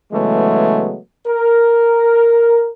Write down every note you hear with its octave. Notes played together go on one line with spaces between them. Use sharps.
C#3 E3 F#3 G#3 A3 B3
A#4